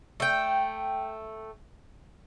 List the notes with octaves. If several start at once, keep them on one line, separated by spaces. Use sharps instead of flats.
A3 G5